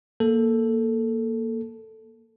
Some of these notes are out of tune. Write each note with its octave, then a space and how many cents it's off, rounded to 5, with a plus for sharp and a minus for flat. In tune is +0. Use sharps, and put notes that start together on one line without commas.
A#3 +0 A4 +0